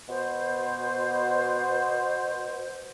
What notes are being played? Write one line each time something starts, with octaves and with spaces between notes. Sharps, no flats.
B2 C5